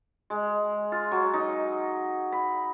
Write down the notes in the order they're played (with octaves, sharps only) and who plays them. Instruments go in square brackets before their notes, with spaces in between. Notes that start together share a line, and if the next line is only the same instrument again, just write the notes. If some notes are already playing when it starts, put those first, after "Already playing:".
[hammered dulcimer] G#3
F4
F#3
D#4
B5